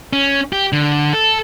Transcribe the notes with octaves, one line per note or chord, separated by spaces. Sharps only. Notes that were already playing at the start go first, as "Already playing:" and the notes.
C#4
G4
D3
A4